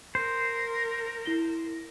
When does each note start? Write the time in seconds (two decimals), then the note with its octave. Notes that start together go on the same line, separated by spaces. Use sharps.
0.15 A#4 C5
1.25 E4 A#6 G7